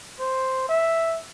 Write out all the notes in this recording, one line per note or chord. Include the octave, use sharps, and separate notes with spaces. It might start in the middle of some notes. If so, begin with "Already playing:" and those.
C5
E5